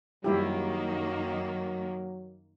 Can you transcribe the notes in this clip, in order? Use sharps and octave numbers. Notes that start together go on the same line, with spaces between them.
F#2 D#3 F#3 G3 A#3 E4 G4